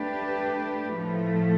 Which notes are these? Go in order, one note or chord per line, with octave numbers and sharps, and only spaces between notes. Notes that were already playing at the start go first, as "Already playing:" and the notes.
Already playing: A3 D4 G4 B4
A2 F3 A3